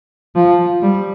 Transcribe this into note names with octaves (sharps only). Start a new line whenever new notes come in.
F3
G3